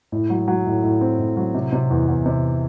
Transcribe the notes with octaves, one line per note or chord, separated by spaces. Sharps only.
A2
F#3
F#3
A2
A2
C4
A2
F#3
C3
C3
E2
E2
C3